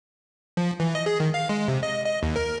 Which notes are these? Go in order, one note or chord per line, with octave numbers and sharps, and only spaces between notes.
F3
E3
D#5
G#4
D#3
F5
G#3
C3
D#5
D#5
D#2
A#4